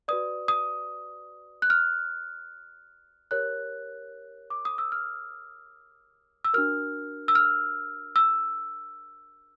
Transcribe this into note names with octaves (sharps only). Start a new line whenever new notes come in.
F#4 B4 D5 D#6
D#6
F#6
F6
G4 A#4 C#5 F#6
D6
D#6
E6
F6
E6
D4 F#4 A#4 F6
E6
F6
E6